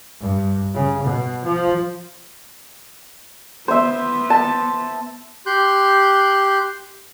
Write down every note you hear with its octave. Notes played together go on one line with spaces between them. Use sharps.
G2
C#3
B2
F3
B3 C5 E5
A5
G4 C6 F#6 G6